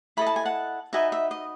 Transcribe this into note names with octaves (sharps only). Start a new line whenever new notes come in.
E4 A4 D#5 B5
A5
G#5
F#5 A5
D#4 F#4 B4 D#5 E5 G#5
E5
D#5